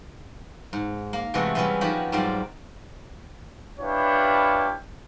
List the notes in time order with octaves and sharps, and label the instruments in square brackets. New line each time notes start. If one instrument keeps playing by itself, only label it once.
[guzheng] G#2
A#3
C3 E3 G#3 A3 B3 F#4
E3 G3 G#3 B3 C#4 E4
D#3 F3 F#4 G4 B5
G#2 F#3 G3 F4 C5 D5
[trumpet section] D4 E4 F4 G4 B4 C#5